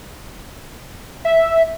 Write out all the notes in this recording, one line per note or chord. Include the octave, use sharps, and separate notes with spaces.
E5